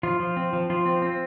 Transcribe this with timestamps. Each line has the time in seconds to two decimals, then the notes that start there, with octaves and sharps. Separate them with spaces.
0.03 F3 F4
0.20 F3
0.37 C4
0.53 F3
0.70 F3 F4
0.86 C4
1.02 C4